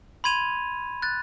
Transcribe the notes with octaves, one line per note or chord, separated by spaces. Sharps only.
B5 C6 G#6 D#7 F7
F#6 A6